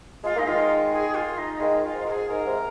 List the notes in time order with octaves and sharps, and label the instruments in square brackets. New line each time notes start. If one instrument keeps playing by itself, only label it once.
[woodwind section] G#3 [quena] F4
[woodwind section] A#3 [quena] D#4
[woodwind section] D#3 G#3 [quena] F4
[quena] G#4
F4
D#4
[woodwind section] D#3 G#3 [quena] F4
[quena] F4
[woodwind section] G#2
[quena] A#4
G#4
[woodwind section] G#2 [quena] A#4
[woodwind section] G#2 C3